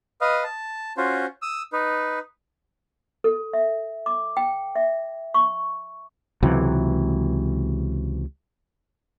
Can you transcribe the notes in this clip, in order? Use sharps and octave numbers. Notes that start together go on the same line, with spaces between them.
B4 D#5 F5
A5
C#4 F4 F#4 C5
D#6 E6
D#4 B4
A4
E5
D6
G5
E5
C#6
C#2 C3 E3 F#3